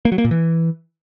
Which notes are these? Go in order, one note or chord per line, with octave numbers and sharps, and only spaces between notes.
A#3
F#3
A#3
A#2
E3